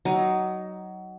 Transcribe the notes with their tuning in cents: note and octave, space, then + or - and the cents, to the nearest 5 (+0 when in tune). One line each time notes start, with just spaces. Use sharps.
F#3 +20 D#4 +0